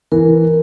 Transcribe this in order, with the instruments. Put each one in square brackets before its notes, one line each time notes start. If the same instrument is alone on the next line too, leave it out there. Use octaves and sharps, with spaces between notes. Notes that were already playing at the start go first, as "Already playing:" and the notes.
[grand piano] E3 [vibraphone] A#4